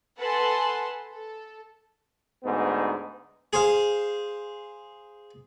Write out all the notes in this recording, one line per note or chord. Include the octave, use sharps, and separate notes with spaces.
A4 B4 F#5 G#5 A5 C6
A4
D2 G#2 B3
G#4 C5 F5